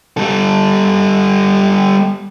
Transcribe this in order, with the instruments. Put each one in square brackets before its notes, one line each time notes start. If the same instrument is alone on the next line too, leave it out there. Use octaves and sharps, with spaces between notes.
[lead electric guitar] G3 A4